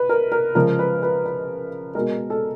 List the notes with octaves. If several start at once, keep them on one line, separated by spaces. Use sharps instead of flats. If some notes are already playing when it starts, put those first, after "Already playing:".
Already playing: B4
A#4
A#4
C#3 F3 G#3 A#4
B4
B4
B4
B2 G#3 A#4
A4